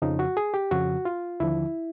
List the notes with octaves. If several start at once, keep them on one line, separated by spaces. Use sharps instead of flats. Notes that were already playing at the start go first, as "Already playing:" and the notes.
F2 C#3 F3 D#4
F#4
G#4
G4
F2 C#3 F3 F#4
F4
D#2 D3 F3 E4